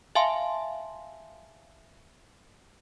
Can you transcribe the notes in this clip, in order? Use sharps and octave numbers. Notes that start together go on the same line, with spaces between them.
E5 F5 G#5 A5 C6